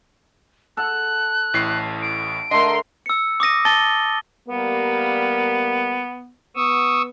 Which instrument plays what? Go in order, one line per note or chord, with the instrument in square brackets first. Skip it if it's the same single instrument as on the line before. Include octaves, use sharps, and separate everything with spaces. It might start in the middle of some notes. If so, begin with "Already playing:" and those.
[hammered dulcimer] A4 F#5 [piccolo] F#6
[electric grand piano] A1 A2 C7
[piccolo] D7
[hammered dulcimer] D3 A3 [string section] A#4 C6 [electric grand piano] D#5
[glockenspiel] E6 C#7
D6 D#6 A#6 D#7
A5 A6 A#6 D#7 G7
[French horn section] G3 A#3 [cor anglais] B3
[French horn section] B3 [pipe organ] C#6 D#6 E6